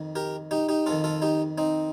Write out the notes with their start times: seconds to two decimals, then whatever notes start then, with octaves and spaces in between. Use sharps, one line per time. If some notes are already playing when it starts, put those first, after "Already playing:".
Already playing: F2 D#3
0.15 G4 A#4
0.51 D#4 G4
0.69 D#4 G4
0.86 F2 D#3 F4 A4
1.04 F4 A4
1.22 D#4 G4
1.58 C4 D#4